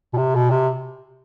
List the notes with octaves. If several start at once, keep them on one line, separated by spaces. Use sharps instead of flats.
B2
C3
B2
C3